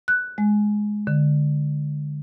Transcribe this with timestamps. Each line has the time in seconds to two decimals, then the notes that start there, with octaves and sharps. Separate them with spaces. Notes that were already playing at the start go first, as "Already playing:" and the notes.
0.08 F#6
0.38 G#3
1.07 D3